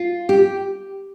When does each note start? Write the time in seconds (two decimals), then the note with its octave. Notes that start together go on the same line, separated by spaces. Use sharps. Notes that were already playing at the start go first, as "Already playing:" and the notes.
Already playing: F4
0.29 G4